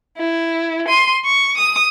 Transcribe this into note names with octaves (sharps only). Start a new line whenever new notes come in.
E4
C6 D#7
C#6
D#6